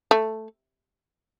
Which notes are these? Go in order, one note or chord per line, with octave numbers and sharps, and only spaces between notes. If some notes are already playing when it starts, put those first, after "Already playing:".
A3